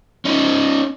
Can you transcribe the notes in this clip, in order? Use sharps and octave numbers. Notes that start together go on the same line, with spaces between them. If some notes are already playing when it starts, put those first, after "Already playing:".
C#4 D#4